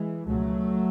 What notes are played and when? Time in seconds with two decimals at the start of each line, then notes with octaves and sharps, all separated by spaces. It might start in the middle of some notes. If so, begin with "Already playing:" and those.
Already playing: E3 G#3
0.26 C#2 B2 F#3 A3